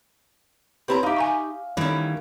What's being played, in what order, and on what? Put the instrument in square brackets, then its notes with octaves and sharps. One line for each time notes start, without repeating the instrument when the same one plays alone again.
[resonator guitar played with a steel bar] C4 E4 A#5 [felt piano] G4 B4 C#5
[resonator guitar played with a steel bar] D#4 G4 [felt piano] E5 F5
[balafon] G#5 A#5 C#6
[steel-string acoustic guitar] D2 D#3 G3 [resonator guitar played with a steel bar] E3 C#4